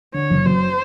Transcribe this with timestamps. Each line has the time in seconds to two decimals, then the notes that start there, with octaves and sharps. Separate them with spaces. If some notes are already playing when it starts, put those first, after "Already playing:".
0.14 D3 C#5
0.30 F#1
0.45 F#2 C5